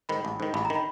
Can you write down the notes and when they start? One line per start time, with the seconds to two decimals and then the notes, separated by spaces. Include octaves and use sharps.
0.09 G#2 D#3 B5
0.25 A1
0.40 G#2 D#3
0.54 A1 B5
0.65 A#5
0.70 D#3
0.75 B5